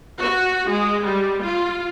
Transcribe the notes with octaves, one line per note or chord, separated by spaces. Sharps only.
F#4
G#3
G3
F4